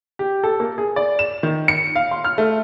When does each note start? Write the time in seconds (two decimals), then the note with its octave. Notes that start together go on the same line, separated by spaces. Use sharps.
0.19 G4
0.44 A4
0.60 A#3
0.78 G#4
0.96 D5
1.19 E7
1.43 D#3
1.68 C#7
1.96 F5
2.11 C6
2.25 F6
2.38 A3